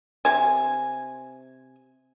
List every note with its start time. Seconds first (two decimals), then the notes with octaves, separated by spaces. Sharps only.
0.25 C3 G#5